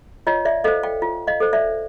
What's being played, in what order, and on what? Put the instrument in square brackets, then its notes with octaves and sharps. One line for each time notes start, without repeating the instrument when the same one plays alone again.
[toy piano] F4 C#5 D#5
D5 E5
A4 C5 D#5 F5
F5 G5
F4
D#5 F5
A4 C5
D5 E5